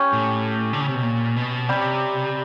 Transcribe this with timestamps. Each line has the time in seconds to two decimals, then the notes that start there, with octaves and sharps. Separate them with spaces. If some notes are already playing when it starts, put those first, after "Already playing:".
Already playing: C#4 G4 C#5 G5
0.13 A2
0.73 D3
0.80 C#3
0.88 C3
0.95 B2
1.03 A#2
1.36 B2
1.69 C3 G3 G4